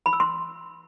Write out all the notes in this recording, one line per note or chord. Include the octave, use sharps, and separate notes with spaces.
B5
E6
C6